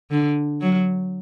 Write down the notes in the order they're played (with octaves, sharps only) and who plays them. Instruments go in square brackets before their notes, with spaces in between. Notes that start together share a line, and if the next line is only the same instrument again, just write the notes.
[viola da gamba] D3
F#3